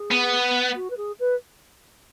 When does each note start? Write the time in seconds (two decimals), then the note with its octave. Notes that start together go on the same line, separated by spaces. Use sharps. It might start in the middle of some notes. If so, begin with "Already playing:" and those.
Already playing: G#4
0.11 B3
0.75 F#4
0.90 B4
0.97 G#4
1.20 B4